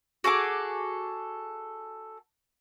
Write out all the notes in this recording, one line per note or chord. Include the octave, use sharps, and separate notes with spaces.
F#4 G#4 A4 D6